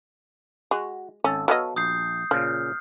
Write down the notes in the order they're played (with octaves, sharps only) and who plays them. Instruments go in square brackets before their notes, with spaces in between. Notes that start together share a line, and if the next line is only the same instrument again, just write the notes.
[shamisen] G#3 [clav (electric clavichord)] F#4
[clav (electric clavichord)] G#1 A4 [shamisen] C#4
[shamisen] F#3 B3 D#5 [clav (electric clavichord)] A4 C#5 F5
[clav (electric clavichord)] A#1 [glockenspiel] D#6 G6 C7
[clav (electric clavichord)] A#2 C#3 [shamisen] F3 [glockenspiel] F6